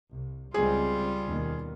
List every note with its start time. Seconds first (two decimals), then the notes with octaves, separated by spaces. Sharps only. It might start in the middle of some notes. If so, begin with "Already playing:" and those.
0.12 C2
0.54 C#2 G3 G#3 C4 F4 G#4
1.27 D#2 B2 D#3